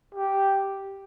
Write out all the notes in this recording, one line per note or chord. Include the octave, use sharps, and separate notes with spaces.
G4